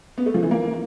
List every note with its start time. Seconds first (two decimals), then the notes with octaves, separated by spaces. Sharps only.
0.18 B3
0.26 A3
0.34 F3
0.43 E3
0.51 A#3